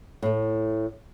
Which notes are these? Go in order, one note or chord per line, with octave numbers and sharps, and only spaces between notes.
A2 A3